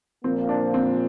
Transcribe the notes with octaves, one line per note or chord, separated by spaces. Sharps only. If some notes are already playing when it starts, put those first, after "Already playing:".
A#2 F3 A#3 C4
D4
C4